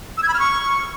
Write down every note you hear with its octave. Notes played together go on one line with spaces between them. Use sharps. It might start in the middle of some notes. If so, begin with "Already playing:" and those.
E6
G#6
B5
F6
C#6